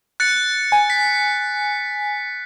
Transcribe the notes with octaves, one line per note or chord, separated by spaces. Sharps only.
F#6 A6 C#7
G#5
B6